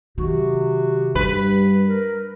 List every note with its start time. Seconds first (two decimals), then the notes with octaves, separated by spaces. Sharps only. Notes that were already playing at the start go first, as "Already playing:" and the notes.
0.18 C3 D#3 F#3 F#4
1.15 G2 G3 B4
1.86 A#4